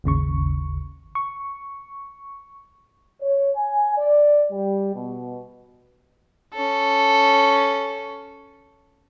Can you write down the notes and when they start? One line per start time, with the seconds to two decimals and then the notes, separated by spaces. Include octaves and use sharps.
0.04 G#1 D#2 C#3 C#6
1.15 C#6
3.20 C#5
3.55 G#5
3.97 D5
4.51 G3
4.93 B2
6.54 C#4 A4